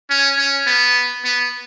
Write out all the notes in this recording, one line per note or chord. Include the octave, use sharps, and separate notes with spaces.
C#4
C#4
B3
B3